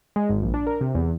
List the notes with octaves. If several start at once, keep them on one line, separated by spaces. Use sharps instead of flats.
G#3
G#1
A#1
D4
A#4
C3
E2